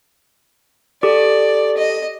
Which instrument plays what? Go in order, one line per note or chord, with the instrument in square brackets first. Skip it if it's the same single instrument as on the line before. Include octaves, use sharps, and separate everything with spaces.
[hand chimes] G4 A4 D6 [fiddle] D5
[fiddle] D#5